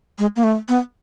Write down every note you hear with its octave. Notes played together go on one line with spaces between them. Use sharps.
G#3
A#3
A3
B3